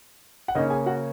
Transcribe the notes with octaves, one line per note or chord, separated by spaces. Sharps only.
F#5
C#3 A#3 C#4 D#4 D#5
G#4 G#5
F#4 F#5